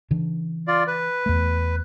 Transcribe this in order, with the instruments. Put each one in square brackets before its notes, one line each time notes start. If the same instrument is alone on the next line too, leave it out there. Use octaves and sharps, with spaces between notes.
[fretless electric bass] C#3 E3 D4
[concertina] F4 D5
B4
[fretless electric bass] E2 A3